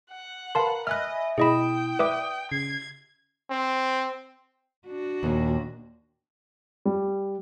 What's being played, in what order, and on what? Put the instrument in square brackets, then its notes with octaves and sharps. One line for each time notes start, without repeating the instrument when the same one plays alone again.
[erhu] F#5
[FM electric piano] A#4 B4 [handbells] F5 A5 C6
[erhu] D#5 [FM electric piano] E5 G#5 B5 [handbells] F6 F#6
[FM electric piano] B2 [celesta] E4 D#6 E7 [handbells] G#4 D#5 B5 [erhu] G5
[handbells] B4 E5 D6 [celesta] D5 [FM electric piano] D#6
[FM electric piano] C#3 [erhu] G#6 [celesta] C7
[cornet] C4
[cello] D4 F#4
[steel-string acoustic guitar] D#2 A#2
[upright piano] G3